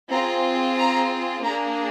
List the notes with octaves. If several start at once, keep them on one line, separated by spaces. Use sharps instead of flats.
C4 F4 G#4 A#5
A#5
A#3 D4 G#4 A#5